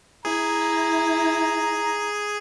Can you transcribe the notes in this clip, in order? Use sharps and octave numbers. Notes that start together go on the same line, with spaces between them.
E4 G#4 A#5